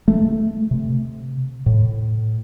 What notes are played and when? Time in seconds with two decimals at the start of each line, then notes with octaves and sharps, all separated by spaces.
0.08 A3
0.71 C3
1.66 A2